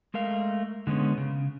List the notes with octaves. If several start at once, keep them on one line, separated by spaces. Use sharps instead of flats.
G#3 A3 A#4 F5
D3 G#3 B3 C#4
C#3